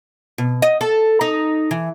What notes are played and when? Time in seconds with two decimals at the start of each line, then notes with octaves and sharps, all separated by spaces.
0.38 B2
0.62 D#5
0.81 A4
1.21 D#4
1.71 E3